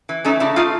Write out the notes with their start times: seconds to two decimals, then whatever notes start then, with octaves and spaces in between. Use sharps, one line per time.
0.09 E3
0.25 A3 C#4 D#4
0.40 C#3 D4 E4
0.56 A3 D#4 F4